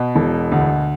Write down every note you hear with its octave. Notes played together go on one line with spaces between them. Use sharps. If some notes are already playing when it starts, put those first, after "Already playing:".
Already playing: B2
E1
D2